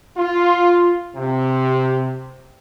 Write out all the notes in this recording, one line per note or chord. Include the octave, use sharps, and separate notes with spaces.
F4
C3